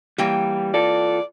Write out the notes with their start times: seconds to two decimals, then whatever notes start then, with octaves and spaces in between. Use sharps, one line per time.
0.18 E3 G3 A#3 G5
0.74 F4 A4 D5